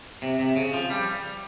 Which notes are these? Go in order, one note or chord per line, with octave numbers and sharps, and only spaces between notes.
C3
C3
C#3
F3
G3